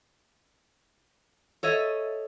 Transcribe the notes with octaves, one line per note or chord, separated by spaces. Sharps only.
A4 C#5 D#5 E5